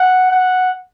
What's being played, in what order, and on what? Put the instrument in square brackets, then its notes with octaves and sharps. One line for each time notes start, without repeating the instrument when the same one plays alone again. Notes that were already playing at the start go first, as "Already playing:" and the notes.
Already playing: [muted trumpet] F#5
F#5